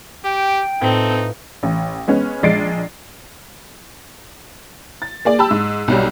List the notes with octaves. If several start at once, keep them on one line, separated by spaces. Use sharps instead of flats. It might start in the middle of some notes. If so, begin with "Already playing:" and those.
G4 G5
A2 C4 D#4 F4 A4 B4
A1
G#3 B3 C#4
A#1 G#3 D5 A6 C7 D7
A6
A#3 G#4 D5
G4 A5 B5 E6
G#2
B1 F#3 G3